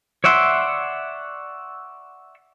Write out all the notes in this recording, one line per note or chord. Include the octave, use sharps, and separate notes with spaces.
C#5 D5 E5 F#5 C6